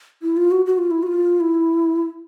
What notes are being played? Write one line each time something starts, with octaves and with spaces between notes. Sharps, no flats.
E4
F4
F#4
F#4
F4
E4
F#4
F4
E4